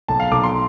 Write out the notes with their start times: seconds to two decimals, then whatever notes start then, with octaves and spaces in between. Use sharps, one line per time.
0.08 B1 A5
0.20 F5
0.31 B1 D6
0.43 C6